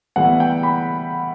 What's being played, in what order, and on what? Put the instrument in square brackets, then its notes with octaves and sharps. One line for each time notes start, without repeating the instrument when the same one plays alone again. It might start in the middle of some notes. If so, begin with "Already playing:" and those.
[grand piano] A2 E3 G3 B3 [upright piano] F#5
[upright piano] G5
B5